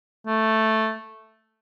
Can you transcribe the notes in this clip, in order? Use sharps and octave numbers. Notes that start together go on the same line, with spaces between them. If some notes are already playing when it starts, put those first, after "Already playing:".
A3